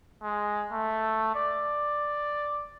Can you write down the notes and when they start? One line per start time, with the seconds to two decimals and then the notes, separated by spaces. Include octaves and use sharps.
0.22 G#3
0.72 A3
1.35 D5